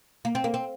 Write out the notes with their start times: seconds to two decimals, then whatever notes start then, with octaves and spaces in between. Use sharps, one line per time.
0.25 A#3
0.35 C4
0.44 A#3
0.54 C4